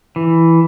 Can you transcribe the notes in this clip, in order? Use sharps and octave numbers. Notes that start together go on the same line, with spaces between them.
E3